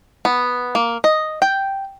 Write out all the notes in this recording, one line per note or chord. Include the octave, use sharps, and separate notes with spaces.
B3
A#3
D#5
G5